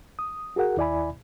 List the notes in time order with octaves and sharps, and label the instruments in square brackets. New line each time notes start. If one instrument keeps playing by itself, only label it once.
[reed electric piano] D#6
F#4 G#4 A#4 F#5
D#2 E4 D5 E5 G#5 B5